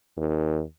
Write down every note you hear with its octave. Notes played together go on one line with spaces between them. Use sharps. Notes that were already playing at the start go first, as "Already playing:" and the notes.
D#2